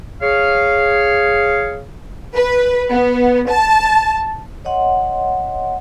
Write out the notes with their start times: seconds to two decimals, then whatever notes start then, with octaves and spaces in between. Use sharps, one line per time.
0.22 G#4 C#5 F5
2.35 B4
2.90 B3
3.50 A5
4.65 C#5 D#5 F#5 C6